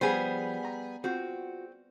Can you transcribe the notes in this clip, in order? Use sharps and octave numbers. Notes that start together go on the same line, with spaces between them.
F3 G3 B3 G#4 C5
A#5
C4 F4 F#4 G#4